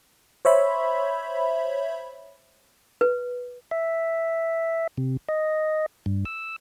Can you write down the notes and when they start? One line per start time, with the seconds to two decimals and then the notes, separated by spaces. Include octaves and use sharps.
0.45 C5 C#5 E5 B5
3.01 B4
3.71 E5
4.98 C3
5.29 D#5
6.06 G2
6.25 E6